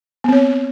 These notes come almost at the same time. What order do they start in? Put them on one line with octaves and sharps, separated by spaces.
B3 C4 C#5